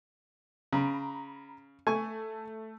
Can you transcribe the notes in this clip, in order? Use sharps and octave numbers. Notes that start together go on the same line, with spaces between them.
C#3 A#5 B5
A3 G#5 C#6